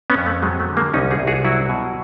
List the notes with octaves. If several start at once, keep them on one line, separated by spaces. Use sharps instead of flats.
B3 C#4
F2
A3
F#3 G#3
A3
D3
G#3 A#3
C2 C#4 D#4
F#4 G#4
C2
F#4 G#4
F#3 E4 F#4
B2